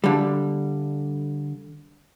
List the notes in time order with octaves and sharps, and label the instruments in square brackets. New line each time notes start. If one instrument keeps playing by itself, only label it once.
[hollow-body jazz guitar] D3 G3